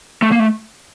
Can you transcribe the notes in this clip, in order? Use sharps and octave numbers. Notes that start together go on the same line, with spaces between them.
A3
A#3
A3